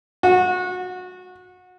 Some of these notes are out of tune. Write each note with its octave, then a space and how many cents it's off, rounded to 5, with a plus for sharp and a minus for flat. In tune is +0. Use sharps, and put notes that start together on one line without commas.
F#4 -25